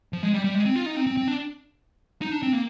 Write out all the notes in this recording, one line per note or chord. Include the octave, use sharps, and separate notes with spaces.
F3
G#3
G3
G3
G#3
C4
F4
D#4
C4
C4
C4
D4
D#4
D4
C4
A#3